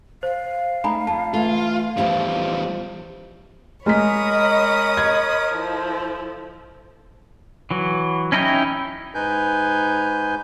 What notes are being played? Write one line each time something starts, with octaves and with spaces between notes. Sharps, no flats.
C5 F5
A3 D#4 G#5 A#5 B5
F2 A5
E3 A3 F4
E2 F3 G3 E4 F4
G#3 A#4 C#5 D#5 B5 D#6 B6
G#6
F3 E4 A4
E3 F#3
C#4 D#4 E4 D#5 G5
G#2 D#4 B4 G#5 G6